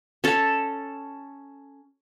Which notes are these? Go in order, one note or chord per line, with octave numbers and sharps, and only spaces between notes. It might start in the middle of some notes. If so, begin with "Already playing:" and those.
C#4 A4